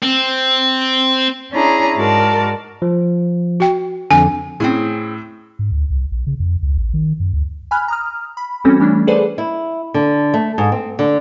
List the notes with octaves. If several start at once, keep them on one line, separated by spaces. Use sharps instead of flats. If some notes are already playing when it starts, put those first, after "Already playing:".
C4
C#4 D4 E4 G#4 A#5
G#2 G#3 F#4 A#4 D5 A5
F3
F#4 G5
F2 D3 G#5
A2 C4 C#4 G#4
G#2
D2
C2
A#1
C#3
F2
C#2
A1
D#3
F#2
D2
G#5 B5 F6 F#6
A#5 D#6 F6
B5
E3 G3 C4 C#4 F#4 A4
E3 G3 A3 C#4 D4
G#4 A4 B4 C5 D5 F#5
E4
D3
A3
G#2
C4
D3